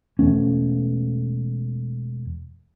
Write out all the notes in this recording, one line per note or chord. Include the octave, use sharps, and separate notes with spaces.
E1 E2 A3 C#4